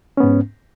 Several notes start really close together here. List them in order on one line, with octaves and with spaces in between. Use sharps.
C#4 B3 G#2